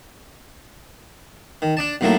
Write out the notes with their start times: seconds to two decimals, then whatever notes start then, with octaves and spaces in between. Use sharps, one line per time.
1.62 D#3
1.77 D4 D5 A5
2.01 B1 A2 F#3 A#3 E4 A4